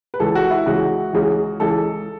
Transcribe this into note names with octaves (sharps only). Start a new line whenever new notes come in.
B4
C#2 C#3 E3 A4
F#4
E4
C#2 C#3 E3 F#4
C#2 C#3 E3
C#2 C#3 E3 A4